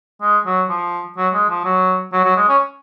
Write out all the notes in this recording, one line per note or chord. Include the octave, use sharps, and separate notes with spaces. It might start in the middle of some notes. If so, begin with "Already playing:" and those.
G#3
F#3
F3
F#3
G#3
F3
F#3
F#3
F#3
G#3
C#4